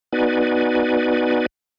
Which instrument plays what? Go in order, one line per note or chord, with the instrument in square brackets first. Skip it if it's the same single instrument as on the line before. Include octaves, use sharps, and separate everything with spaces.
[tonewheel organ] B3 D#4 F#4 B4 D5 G#5